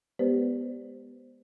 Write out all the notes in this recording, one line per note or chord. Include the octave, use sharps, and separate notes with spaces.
G#3 B3 G4 B4 C5 D5